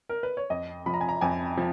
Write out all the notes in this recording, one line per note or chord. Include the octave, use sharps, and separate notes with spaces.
A#4
B4
C#5
F2 D#5
F3 B5
A#5
G#5
A#5
F2 G#5
F3